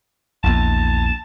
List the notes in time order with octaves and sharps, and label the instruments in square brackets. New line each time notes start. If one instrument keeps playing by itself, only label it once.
[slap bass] A#1 E2 [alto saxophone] A5